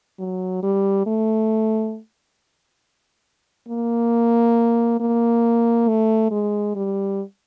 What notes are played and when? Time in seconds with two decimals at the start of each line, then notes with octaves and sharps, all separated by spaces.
0.19 F#3
0.63 G3
1.06 A3
3.69 A#3
5.00 A#3
5.88 A3
6.31 G#3
6.76 G3